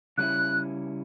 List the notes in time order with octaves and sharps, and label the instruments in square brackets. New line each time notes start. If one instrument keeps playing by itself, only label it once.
[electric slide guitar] C#3 G3 C#4 E4 [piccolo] F#6